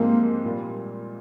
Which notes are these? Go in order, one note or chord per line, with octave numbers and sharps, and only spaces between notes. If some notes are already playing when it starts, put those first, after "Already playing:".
Already playing: G#2 F3 G#3 A#3 C4 G4
A#2 G3 A#3 F4